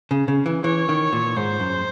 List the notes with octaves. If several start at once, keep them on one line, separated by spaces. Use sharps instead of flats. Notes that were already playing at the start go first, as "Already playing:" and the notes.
C#3
C#3
E3
E3 C#5
D#3
A#2
G#2 C5
F#2